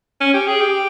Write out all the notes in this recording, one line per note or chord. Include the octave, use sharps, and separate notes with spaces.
C#4
G4
G#4
G4